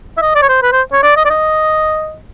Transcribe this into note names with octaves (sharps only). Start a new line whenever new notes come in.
E5
D#5
D5
C#5
C5
B4
C5
C#5
D5
D#5
D5
D#5